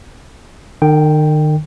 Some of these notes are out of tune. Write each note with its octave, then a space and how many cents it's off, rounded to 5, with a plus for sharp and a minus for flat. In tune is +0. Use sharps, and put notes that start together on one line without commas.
D#3 -40 G5 +0